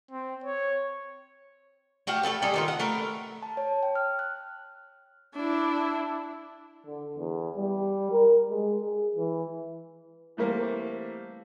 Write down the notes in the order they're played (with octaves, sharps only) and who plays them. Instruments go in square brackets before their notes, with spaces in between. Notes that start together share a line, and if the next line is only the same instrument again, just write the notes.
[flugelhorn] C4
C#5
[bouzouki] A3 F#4 G4 F5
A3 G#4 A4 B4
G3 G#3 D#4 A4
D#3 D#4 F4
F#5
A3 A#4 B4
[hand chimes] A5
C#5
G5
F6
F#6
[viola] D4 E4
[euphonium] D3
E2
G3
A#4
G#3
G#4
E3
[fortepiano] E3 G3 A3 A#3 C4